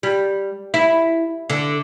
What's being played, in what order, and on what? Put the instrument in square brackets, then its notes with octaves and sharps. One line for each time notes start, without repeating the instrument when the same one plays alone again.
[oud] G3
E4
D3